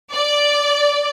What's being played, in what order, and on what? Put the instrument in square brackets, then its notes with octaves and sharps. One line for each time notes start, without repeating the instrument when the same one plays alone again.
[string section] D5